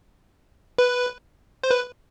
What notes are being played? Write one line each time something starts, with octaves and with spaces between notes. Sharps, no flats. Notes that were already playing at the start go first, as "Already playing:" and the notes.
B4
C5
B4